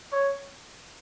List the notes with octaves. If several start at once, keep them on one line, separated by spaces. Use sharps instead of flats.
C#5